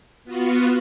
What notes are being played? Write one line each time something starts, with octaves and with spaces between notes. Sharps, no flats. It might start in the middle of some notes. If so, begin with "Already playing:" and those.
B3 F4 F#4